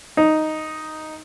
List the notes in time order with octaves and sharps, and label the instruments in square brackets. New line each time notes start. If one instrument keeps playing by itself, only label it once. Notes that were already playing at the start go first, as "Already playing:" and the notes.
[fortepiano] D#4